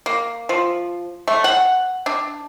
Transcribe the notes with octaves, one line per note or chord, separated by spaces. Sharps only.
A#3
F3
A3
F#5
D4